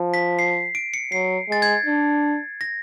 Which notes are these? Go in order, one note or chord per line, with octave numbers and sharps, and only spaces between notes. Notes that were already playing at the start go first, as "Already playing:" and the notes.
Already playing: F3
B6
C7
D7
C#7
F#3 C7
G#3 A6
G#6
D4
A#6